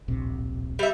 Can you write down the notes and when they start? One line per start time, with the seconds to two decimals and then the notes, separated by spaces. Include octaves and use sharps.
0.08 D1 A#1 C3
0.79 G3 E5